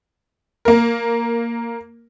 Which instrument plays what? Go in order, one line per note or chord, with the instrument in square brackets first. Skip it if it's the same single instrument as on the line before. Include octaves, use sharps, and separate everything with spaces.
[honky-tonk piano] A#3 A#4